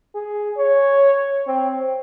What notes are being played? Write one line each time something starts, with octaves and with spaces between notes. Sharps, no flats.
G#4
C#5
C4